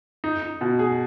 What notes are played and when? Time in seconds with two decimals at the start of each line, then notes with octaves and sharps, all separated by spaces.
0.24 D#4
0.42 D#4
0.61 B2
0.79 G#4